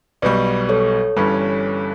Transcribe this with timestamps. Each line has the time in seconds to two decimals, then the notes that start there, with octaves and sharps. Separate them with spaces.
0.22 B1 B2 G3 B4 D5
0.69 A4 C#5
1.17 G1 G2 E3 G3 C#4